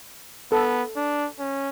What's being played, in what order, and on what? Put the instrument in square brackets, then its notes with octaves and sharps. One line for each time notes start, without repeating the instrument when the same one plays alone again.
[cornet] B3 [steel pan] A4
[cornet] D4
C#4